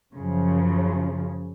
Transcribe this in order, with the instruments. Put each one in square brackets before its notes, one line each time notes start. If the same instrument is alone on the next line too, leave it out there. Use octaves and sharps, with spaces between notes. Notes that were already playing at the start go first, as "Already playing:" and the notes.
[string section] F#2 C#3 F3